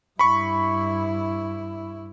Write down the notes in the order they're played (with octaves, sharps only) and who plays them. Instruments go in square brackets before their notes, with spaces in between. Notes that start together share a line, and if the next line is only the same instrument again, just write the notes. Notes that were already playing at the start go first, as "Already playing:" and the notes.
[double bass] G2 E4 [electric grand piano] B5 C#6